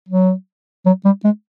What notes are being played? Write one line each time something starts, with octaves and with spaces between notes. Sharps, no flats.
F#3
F#3
G3
G#3